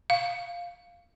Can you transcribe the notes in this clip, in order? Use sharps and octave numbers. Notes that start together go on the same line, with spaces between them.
F5